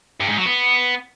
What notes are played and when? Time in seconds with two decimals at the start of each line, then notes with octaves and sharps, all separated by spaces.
0.20 G2
0.29 G#2
0.37 F#3
0.46 B3